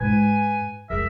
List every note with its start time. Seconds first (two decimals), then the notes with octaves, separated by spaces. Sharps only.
0.01 G#2 E4 B4 G#5
0.90 C2 F2 G#4 A#4 E5